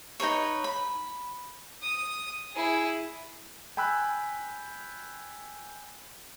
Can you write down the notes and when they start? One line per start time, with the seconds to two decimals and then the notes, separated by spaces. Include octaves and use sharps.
0.20 D#4 G#4 B4 C#5
0.64 B5
1.82 D#6
2.54 E4 G#4
3.77 G5 G#5 B5 E6 F#6